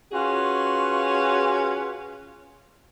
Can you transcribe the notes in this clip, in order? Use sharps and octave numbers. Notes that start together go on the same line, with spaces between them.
C#4 F4 F#4 G#4 B4